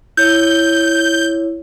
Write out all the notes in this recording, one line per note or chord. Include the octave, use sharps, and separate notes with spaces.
E4 C#5 G6